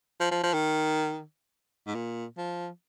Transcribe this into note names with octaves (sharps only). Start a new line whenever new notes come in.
F3
F3
F3
D#3
G#2
A#2
F3